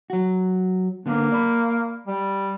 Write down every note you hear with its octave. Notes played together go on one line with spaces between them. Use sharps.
F#3 F#4
D3 A#3 B3 D4
D5 B5
G3